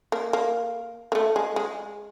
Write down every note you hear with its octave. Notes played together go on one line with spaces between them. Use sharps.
A#3
A#3
A#3
A3
G#3
G#3